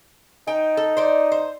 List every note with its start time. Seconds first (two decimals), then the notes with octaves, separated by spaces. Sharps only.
0.47 D#4 G5
0.77 A4
0.97 C5 D5
1.32 C5